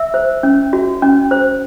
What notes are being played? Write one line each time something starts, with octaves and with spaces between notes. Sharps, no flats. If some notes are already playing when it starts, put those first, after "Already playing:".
Already playing: E5 E6
C5
C#4
F#4
C#4
C5